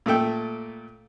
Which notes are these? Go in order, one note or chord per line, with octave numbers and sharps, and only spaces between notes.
A#2 A3 A4 G5